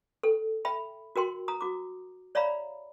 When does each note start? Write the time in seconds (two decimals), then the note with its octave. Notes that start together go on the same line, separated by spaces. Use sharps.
0.23 A4 G5
0.65 E5 G5 B5
1.16 F#4 A#4 G5 C6
1.48 A#5 D#6
1.61 F#4 D6
2.35 C#5 D5 E5 F5 A#5 B5